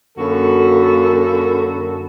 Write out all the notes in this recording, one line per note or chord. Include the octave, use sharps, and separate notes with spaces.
F#2 D3 A#3 F#4 A4 B5